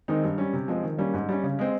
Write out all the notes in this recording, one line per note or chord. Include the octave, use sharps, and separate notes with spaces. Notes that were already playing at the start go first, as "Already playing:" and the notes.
D#3 G#3 C4 D#4
G2
G3 C#4
C3
F3 G#3 C4
D#3
G3 A#3 C#4
G#2
G3 C#4
C#3
G#3 C4